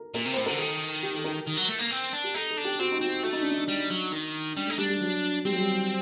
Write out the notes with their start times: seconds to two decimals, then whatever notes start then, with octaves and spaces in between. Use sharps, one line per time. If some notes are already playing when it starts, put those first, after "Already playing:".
Already playing: A4 A#4
0.14 A#2 A#4
0.25 C3
0.34 A2 C5
0.46 D3 A#4
0.58 D#3 A4
1.03 G4
1.14 A4
1.24 A#4
1.47 D#3
1.58 F#3
1.69 A3
1.79 A#3
1.92 C4
2.13 D4
2.24 G4
2.35 D#4 A4
2.51 A4
2.58 D4
2.64 G4
2.79 C4 F#4
2.92 D#4
3.01 C4 F#4
3.23 A3 F#4
3.33 D#4
3.42 D4
3.52 D#4
3.68 G3
3.90 F#3
4.12 D#3
4.56 G3 D4
4.67 A3
4.70 D#4
4.78 G3 D4
4.90 G3
5.01 F#3
5.45 G3 C4
5.53 F#3
5.59 G3